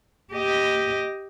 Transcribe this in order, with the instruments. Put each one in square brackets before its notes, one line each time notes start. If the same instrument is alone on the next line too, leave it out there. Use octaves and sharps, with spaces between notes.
[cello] G4 D#5